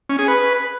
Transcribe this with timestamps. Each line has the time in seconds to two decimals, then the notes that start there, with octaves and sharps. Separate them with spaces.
0.09 C#4
0.19 G#4
0.28 B4